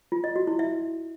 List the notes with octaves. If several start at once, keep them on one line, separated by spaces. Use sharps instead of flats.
F4
D#5
F#4
E4
E5